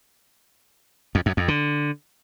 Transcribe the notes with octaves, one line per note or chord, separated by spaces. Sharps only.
F2
F#2
F2
D3